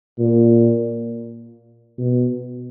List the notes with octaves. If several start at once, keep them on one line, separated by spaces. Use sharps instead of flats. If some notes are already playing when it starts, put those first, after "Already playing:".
A#2
B2